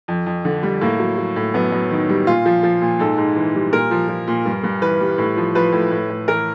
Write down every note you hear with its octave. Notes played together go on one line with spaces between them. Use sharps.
F2
F2
D3
G3
A2 A#3
F#3
F#3
A2
F#2 B3
F#2
D#3
G3
A#2 F4
F3
F3
A#2
G#2 A4
G#2
E3
G3
A#2 A#4
F3
F3
A#2
G2
G2
E3 B4
G3
A2
F3
F3 B4
A2
A2
A2
E3 A#4